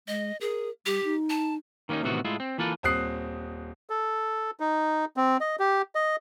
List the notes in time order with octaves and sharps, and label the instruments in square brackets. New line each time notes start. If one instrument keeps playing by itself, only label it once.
[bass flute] G#3 [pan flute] D#5
[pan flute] G#4 [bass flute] A#4
[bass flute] G3 [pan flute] G4
[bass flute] D#4
[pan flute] A5
[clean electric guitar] D#3 A#3 B3 C#4 D#4
A2 C3 D#3 E3 B3 F#4
A2 G#3 E4 F4
C4
E3 A#3 F4 A4 B4
[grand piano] D#1 C4 D#6 F#6 C7
[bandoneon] A4
D#4
C4
D#5
G4
D#5